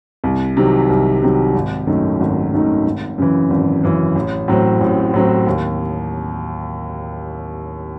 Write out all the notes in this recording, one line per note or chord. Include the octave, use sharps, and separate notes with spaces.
C2
C3 D#3 F#3
C2
C3 D#3 F#3
G#1
F#2 D#3 A3 D#4
G#1
F#2 D#3 A3 D#4
G#1
F#2 C#3 E3
G#1
F#2 C#3 E3
A1
A2 F#3 C4
A1
A2 F#3 C4
D#2